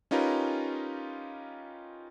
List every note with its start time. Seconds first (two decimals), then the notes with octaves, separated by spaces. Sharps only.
0.11 C#4 D#4 F4 G4 A#4 B4